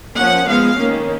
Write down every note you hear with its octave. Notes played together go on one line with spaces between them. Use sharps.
F3 A#3 C#4 F#5
F3 G#3 B3 F5
D#3 A#3 C#4